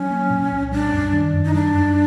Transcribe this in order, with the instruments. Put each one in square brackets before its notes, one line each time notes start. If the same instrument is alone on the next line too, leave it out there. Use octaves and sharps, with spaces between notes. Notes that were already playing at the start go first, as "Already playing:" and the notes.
Already playing: [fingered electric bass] F#3 [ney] C#4
[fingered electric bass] A#3
A#2
C2
[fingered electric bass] G3 [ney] D4
[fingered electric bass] F#2
D#3
F#2
[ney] D#4
[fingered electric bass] G3 [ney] D4
[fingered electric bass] F#2